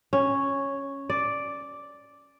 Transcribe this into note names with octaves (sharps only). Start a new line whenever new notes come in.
C#4
D5